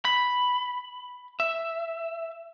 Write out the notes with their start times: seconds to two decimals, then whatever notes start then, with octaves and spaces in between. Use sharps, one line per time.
0.05 B5
1.40 E5